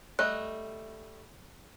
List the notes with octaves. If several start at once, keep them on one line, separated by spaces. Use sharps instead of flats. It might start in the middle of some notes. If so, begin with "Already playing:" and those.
G3 A3 D#5 F#6